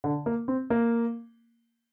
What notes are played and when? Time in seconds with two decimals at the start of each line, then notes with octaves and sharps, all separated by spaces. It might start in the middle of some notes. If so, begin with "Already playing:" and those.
0.04 D3
0.26 A#3
0.48 C4
0.70 A#3